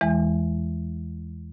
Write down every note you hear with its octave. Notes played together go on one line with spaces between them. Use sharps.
E2 E3 G#3